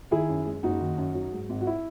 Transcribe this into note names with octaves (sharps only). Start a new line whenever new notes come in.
D#3 E4 G#4
F#2
G#3
F#1 D#4 F#4
D#3
F#2
F#3
G#2
G#1
F#4
E4